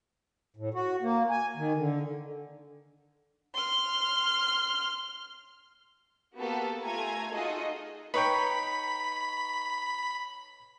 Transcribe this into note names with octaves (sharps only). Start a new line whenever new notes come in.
A2
F#4
A#3
G#5
D#3
D3
C6 F6
A#3 B3 F#4 G4 A4
A3 F4 G#5 A#5 G#6
D#4 F4 F#4 G#4 A4 D#5
D#4 B4 C#5 G5 B5